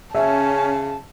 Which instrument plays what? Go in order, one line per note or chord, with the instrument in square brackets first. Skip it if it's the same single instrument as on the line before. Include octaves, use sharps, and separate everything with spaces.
[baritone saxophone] C#3 [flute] C#4 [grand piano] E5 [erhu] A5